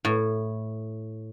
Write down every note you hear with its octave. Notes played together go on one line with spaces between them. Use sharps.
A2